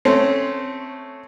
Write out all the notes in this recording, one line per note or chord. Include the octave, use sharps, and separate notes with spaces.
A3 C4 C#4